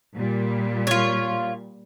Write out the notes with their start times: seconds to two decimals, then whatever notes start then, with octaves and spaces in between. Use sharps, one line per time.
0.16 A#2 G3
0.87 F4 C#5